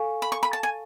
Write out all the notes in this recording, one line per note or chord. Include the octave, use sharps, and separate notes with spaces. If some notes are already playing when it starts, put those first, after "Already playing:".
Already playing: A4 F5 G#5 C#6
B5
C#6
B5
A5
G#5